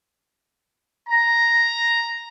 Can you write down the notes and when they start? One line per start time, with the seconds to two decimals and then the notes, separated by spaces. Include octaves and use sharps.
1.09 A#5